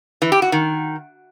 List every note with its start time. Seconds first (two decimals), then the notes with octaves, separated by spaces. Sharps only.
0.22 E3
0.32 G4
0.42 F#4
0.52 D#3